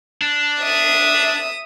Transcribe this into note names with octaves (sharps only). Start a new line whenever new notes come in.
D4
E5 D#6